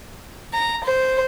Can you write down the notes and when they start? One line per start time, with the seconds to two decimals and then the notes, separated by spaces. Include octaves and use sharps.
0.53 A#5
0.84 C5